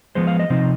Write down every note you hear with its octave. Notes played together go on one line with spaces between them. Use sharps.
F3 G#3 B3 C5
F5
D#5
C3 F3 C4 D#4